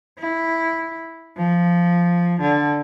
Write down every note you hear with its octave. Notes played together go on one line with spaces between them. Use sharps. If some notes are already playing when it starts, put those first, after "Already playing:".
E4
F3
D3